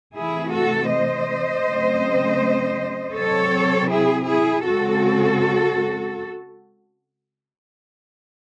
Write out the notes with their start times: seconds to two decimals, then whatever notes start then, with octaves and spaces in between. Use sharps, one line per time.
0.15 C3 E3 A3 E4 G#4
0.53 F#4 A4
0.91 C5 D#5
1.65 C#3 F#3 A3 C4
3.15 C3 F#3 C4 A4 C#5
3.89 E4 G#4
4.27 E4 G#4
4.64 C#3 G#3 C4 F#4 A4